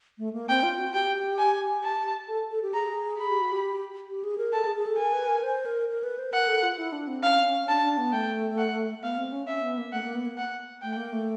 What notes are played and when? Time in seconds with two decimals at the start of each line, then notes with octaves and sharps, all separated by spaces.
0.18 A3
0.33 A#3
0.49 C4 G5
0.63 F4
0.78 F#4
0.94 G4 G5
1.39 G#5
1.84 A5
2.28 A4
2.51 A4
2.62 G4
2.74 G#4 A#5
3.19 G#4 B5
3.29 G4
3.41 F#4
3.52 G4
4.08 G4
4.24 G#4
4.38 A#4
4.53 A4 A5
4.65 G#4
4.76 G#4
4.87 A4
4.98 A#4 G#5
5.13 B4
5.28 A#4
5.43 C5
5.66 A#4
5.89 A#4
6.03 B4
6.18 C5
6.33 A#4 F#5
6.48 A4
6.63 F4
6.78 E4
6.92 D4
7.07 C4
7.23 C#4 F5
7.46 C#4
7.68 D4 A5
7.83 D4
7.97 B3
8.13 A3 G5
8.58 F#5
9.02 B3 F5
9.17 C4
9.32 C#4
9.47 C#4 E5
9.62 B3
9.78 A#3
9.92 A3 F#5
10.03 A#3
10.15 B3
10.26 A#3
10.38 F#5
10.82 A3 G5
10.97 A#3
11.12 A3